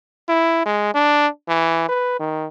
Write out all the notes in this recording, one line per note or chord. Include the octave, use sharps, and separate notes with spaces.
E4
G#3
D4
E3
B4
D#3